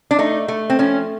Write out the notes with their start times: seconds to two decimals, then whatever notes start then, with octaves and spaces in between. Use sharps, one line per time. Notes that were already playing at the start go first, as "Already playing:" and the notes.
0.11 D4
0.19 A3 D#4
0.48 A3
0.70 C4
0.79 F3 C#4